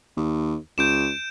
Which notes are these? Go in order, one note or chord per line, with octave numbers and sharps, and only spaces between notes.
D#2
C#2 G6 D7 E7